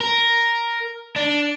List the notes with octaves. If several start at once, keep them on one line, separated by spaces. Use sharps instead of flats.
A#4
D4